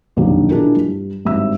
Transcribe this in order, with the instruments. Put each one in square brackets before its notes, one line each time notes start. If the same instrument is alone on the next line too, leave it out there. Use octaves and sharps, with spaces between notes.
[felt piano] F1 A#1 F#2 B2 D#3 D4
B2 D4 E4 F4 G#4 A#4
G2
G#1 G2 E5 E6